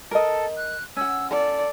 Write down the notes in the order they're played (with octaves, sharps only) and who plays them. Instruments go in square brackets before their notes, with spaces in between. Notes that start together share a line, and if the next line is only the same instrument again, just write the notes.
[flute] A4 [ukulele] A#4 D#5
[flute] F#6
[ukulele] C#4 F#5 [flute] E6
[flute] A4 [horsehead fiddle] D5